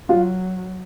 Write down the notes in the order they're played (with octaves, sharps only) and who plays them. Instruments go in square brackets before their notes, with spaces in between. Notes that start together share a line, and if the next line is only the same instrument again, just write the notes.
[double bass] F#3 [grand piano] F4